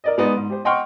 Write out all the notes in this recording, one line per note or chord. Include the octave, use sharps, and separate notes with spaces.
A#4 D5 D#5
G#3 B3 D#4 D5
G#2
G4 C5
D#5 F#5 G5 C6 C#6 F6